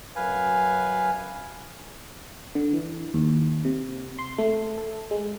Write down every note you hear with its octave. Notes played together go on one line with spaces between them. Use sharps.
F#2 B4 F5 G#5
D3
E3
D#2
C3
C6
A3
A4
G#3